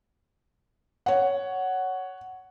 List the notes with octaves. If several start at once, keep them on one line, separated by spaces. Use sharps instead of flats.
C#5 F#5